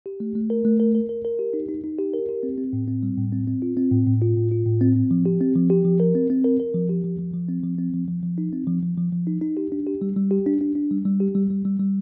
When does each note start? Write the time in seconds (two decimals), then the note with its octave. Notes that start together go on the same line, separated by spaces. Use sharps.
0.06 G4
0.20 A3
0.35 A3
0.50 A#4
0.65 A3
0.80 A#4
0.95 A#4
1.09 A#4
1.25 A#4
1.39 G4
1.53 D#4
1.69 D#4
1.84 D#4
1.99 G4
2.14 A#4
2.29 G4
2.43 C4
2.58 C4
2.73 A2
2.88 C4
3.03 G3
3.17 A2
3.33 C4
3.47 C4
3.62 F4
3.77 C4
3.92 A2
4.07 A2
4.22 F4
4.37 A2
4.51 F4
4.66 A2
4.81 C4
4.96 C4
5.11 F3
5.26 G4
5.41 C4
5.56 F3
5.70 G4
5.85 F3
6.00 A#4
6.15 C4
6.30 C4
6.44 A#4
6.60 A#4
6.74 F3
6.89 G4
7.04 F3
7.19 F3
7.34 F3
7.48 C4
7.64 F3
7.78 C4
7.94 F3
8.08 F3
8.23 F3
8.38 D#4
8.53 C4
8.67 F3
8.83 F3
8.97 F3
9.12 F3
9.27 D#4
9.41 D#4
9.57 G4
9.72 D4
9.87 G4
10.01 G3
10.16 G3
10.31 G4
10.46 D4
10.61 D4
10.75 D4
10.91 G3
11.05 G3
11.20 G4
11.35 G3
11.50 G3
11.65 G3
11.80 G3